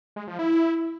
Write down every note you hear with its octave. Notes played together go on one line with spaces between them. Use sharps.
G#3
F3
E4